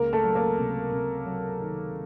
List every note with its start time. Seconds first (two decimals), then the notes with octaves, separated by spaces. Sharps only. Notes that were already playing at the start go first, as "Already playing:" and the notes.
Already playing: C#2 A#3 A#4
0.13 A3 A4
0.24 F#3
0.35 A#3 A#4
0.59 C3
0.92 C3
1.26 F#3
1.60 D#3